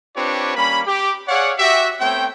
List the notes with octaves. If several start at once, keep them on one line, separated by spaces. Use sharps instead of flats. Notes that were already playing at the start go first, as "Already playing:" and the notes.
C4 D4 F4 G4 B4 C#5
G3 A#3 C#4 B5
G4
G#4 C#5 D5 F5 F#5
F#4 G4 E5
A3 B3 C4 C#5 G5